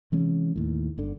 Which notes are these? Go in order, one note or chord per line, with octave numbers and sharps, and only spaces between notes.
C3 E3 G#3 C#4
D#2 A2
G1 D3